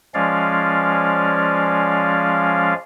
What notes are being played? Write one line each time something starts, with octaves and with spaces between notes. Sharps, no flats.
F3 G#3 C#4 D5 F5